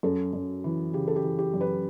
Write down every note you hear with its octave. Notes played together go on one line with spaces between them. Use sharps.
F#2 A4
F#2
E3
C#3 G4
A4
G4
E3
G4
F#2
B4